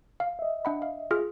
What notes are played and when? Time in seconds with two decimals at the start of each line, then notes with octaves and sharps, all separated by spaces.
0.20 F5
0.39 D#5 E5
0.65 D4 F#5 B5
0.82 F5
1.11 F4 G#4 F6